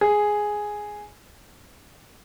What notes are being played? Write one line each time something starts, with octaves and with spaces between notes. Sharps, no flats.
G#4